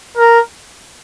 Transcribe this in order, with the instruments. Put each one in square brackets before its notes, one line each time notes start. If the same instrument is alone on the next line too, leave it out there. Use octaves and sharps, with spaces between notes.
[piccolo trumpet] A#4